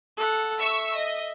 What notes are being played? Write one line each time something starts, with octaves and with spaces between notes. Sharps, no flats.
A4 F#5
E5 C#6 E6
D#5